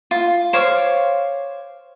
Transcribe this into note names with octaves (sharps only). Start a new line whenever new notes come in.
F4
C5 C#5 F5 D6